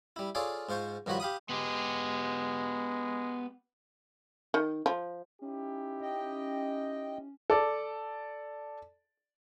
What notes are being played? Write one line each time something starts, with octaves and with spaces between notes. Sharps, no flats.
G3 E4
F4 G#4 A4 C#5 D5 F5
G#2 F4 C5 C#6
G2 D#3 F3 F#4 C#5 B5
G4 F5 B5 D#6
G#3 B3 G4
D#3
F3
C#4 D#4 E4 G4
D#5 G5
A4 D5